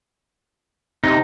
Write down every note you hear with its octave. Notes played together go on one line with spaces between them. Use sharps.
C3 D#4